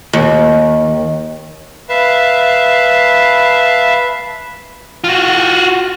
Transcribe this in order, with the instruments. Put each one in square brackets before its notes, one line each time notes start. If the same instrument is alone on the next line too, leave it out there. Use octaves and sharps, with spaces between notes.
[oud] D#2
[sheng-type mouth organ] B4 [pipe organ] E5 F5 A5
[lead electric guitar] F4 F#4